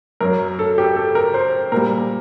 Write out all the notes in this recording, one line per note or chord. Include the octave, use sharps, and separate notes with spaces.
F#2 F#3 A#4
A4
G4
A4
A#4
C5
A#2 G3 A#4